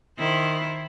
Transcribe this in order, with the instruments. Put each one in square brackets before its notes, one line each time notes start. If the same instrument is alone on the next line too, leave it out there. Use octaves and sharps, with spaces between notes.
[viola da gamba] D#3 E4 C5